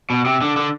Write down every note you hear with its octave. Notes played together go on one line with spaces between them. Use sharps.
B2
C3
D3
D3